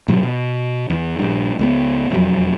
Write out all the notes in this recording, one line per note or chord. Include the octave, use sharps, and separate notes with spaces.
G#2 B2 F#3 G3
B2
E2 E3
A#1 G2
C#2 G#3 B3
E1 F2 F#3